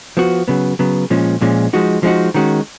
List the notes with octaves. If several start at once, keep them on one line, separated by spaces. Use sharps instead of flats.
F3 B3 F#4
C#3 F#3 B3
C#3 F#3 B3
A#2 F3 G#3 C#4
A#2 F3 G#3 C#4
F3 G#3 D#4 F#4
F3 G#3 D#4 F#4
D#3 G#3 C#4 F#4